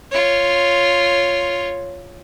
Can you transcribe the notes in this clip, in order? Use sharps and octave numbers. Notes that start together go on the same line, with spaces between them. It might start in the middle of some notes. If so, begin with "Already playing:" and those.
F4 C#5